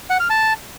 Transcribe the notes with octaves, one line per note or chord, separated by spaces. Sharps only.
F#5
F6
A5